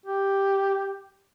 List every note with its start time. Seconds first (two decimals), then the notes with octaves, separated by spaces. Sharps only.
0.06 G4